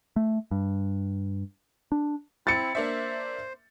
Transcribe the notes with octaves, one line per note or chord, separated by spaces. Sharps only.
A3
G2
D4
C4 E4 A6 C#7
A#3 D4 C5 E5